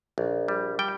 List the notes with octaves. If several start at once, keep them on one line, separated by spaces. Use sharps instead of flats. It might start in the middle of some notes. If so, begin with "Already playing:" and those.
A#1
G3
G3 G5